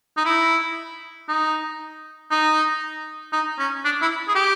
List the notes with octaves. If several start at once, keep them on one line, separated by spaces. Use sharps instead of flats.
D#4
E4
D#4
D#4
D#4
C#4
D4
E4
G#4
G4